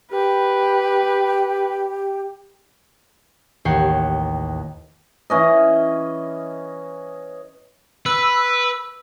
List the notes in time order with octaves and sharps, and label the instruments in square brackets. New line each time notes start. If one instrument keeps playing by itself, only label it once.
[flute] G4 [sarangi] B4
[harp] A1 D#2 C#5 F#5 G5 C7
[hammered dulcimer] E3 C#4 D#5
[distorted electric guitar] B4 [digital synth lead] E6